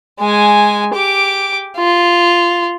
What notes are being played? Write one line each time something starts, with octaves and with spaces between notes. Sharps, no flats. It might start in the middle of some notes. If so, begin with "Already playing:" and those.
G#3 G#5
G4 D6
F4